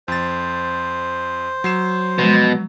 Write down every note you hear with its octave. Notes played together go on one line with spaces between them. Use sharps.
F2 C5 A6
F#3 C7 E7
B2 F3 G#3